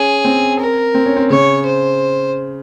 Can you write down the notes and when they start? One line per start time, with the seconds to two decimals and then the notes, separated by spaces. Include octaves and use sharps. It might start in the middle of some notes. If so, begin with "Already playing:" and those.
Already playing: C#4 G#4
0.25 C4
0.60 A#4
0.95 C4
1.06 C#4
1.16 C4
1.30 C#3 C#5
1.66 C5